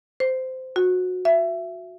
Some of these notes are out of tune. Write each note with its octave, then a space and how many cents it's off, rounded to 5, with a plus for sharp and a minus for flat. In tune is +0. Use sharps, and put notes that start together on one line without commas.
C5 -15
F#4 -20
E5 +20